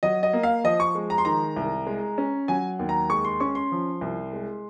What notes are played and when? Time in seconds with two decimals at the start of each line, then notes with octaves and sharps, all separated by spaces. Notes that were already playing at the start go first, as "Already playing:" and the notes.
0.03 F#3 D#5
0.23 D#5
0.33 A#3
0.43 F5
0.64 F3 D#5
0.80 C#6
0.95 G#3
1.10 A#5
1.18 C6
1.25 D#3 A#5
1.57 C2
1.87 G#3
2.18 C#4
2.48 F#3 G#5
2.79 D#2
2.89 A#5
3.10 G#3 C#6
3.25 C6
3.40 C#4 C#6
3.55 C6
3.72 F3
4.01 C2
4.33 G#3